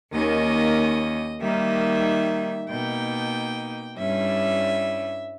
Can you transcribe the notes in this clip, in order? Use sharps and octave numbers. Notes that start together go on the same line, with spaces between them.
D#2 D#3 A#3 C#4 D#5
D#3 G3 A#3 D#4 E5
B2 A#3 D#4 G5
G2 G3 C#4 E4 E5